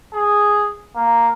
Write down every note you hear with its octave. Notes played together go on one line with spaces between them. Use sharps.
G#4
A#3